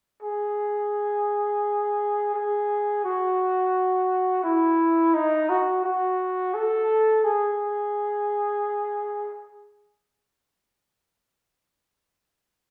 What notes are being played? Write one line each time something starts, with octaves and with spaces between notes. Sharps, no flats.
G#4
G#4
F#4
E4
D#4
F#4
F#4
A4
G#4